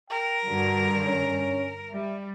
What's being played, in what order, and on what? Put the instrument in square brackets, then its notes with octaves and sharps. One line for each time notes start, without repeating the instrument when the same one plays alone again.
[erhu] A#4 [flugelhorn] G5
[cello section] G2 D3 [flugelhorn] F#4
[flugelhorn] C#4
[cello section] G3 [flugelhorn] E5